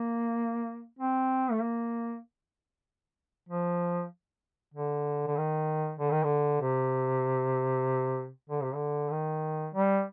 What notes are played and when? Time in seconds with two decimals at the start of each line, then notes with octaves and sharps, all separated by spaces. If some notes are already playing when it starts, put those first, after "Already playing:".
Already playing: A#3
0.99 C4
1.51 A3
1.62 A#3
3.49 F3
4.74 D3
5.27 D3
5.37 D#3
5.99 D3
6.11 D#3
6.24 D3
6.61 C3
8.50 D3
8.62 C3
8.74 D3
9.11 D#3
9.75 G3